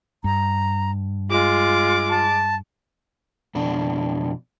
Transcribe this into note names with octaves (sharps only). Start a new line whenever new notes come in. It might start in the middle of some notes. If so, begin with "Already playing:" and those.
G2 A#5
G#3 F4 D6
A5
F2 B2 D4